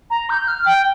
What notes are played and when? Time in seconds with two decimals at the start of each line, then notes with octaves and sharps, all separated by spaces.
0.10 A#5
0.30 G6
0.48 F6
0.66 G5